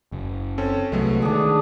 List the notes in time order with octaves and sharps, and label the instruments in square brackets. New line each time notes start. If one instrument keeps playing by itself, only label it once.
[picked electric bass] F#1
[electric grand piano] C4 C#4 A4
[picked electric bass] C2 F#3 [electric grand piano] G#3 A3 B3
[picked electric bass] D3 D#3 [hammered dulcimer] D4 G#4